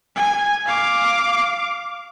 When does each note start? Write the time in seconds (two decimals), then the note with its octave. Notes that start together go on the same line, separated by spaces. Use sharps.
0.16 G#5
0.66 F5 D6